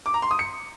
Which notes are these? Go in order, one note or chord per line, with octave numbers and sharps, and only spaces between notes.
D6
A#5
C6
D#6
C#7